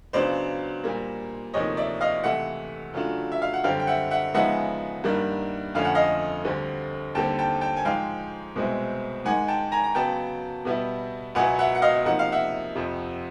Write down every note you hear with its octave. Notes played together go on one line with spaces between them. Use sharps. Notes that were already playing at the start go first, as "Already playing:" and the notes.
C#2 C#3 F#3 B3 D4 C5 D5
A#2 G3 A#3
D2 C3 F3 A#3 D#4 C#5 D#5
D5 E5
D#5 F5
C#2 C3 E3 A3 E5 F#5
C#3 F#3 A3 D4 F4
E5
F5
F#5
F#2 D3 G3 C4 F5 G5
G5
E5 F#5
E5 F#5
C#3 F3 G#3 B3 D#4 E5 F#5
G2 D#3 G3 A#3 D4
F2 D3 F3 A3 C#4 F5
F#5
D#5 F5
D2 D3 G3 C4
D#2 D3 G3 C4 G5 A5
G5 A5
G5 A5
G#5
G#2 F3 G#3 F5 G5
C2 B2 G#3 C4 E4
G#2 D#3 G#3 F#5 G#5
G5 A5
G#5 A#5
A#5
C#3 F#3 B3 G5 A5
B2 G3 B3 E4
C#2 B2 F#3 B3 E4 F#5 G#5
E5 F#5
F#5
D#5 F5
C3 F3 A#3 D#4 F#5
F5
E5 F#5
F2 C3 F3